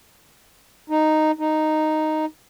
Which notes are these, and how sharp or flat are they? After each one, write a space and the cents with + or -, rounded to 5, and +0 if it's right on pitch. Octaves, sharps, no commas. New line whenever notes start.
D#4 -5
D#4 -5